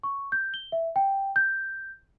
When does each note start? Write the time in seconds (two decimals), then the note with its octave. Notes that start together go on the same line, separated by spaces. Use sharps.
0.03 C#6
0.32 G6
0.54 G7
0.72 E5
0.96 G5
1.36 G6